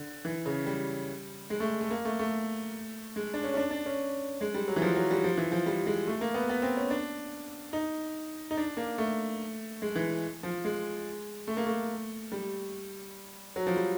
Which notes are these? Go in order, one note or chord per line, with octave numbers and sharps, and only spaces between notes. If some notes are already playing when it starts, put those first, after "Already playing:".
Already playing: D3
E3
C#3
G3
G#3
A3
A3
A#3
A3
A3
G#3
D4
C#4
C#4
D4
D4
C#4
G#3
G3
F#3
E3
F3
F#3
G3
F3
E3
F3
G3
G#3
A3
A#3
B3
B3
C4
C#4
D4
D#4
D#4
D4
A#3
A3
G#3
E3
F3
G#3
A3
A#3
A3
G3
F#3
F3
G3